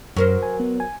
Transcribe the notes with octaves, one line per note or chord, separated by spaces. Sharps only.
F#2 F#3 A#4 C5
G#5
B3
G#5